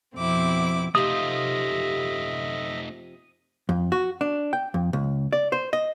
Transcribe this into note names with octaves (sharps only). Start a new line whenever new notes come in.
F2 B2 C4 E4 D6
C3 F3 A3 D#4 D#5 E5 D#6
F2
F#4
D4
G5
F2
C#2
D5
C5
D#5